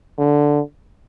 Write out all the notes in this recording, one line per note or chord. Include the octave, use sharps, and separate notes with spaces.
D3